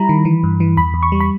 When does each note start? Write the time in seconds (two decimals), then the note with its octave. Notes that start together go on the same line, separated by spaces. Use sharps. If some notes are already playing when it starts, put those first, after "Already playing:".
Already playing: G3 E4 A#5 B5
0.09 D#3
0.25 E3
0.44 G2
0.60 E3
0.77 E2 B5
0.94 E2
1.03 C#6
1.12 G3
1.20 B5